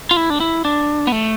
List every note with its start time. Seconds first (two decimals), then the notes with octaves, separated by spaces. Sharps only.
0.11 F4
0.17 E4
0.30 D4
0.40 E4
0.65 D4
1.07 B3
1.12 A3